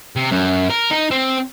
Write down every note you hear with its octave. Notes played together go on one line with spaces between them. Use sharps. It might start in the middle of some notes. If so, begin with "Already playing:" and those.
C3
F#2
A#4
D#4
C4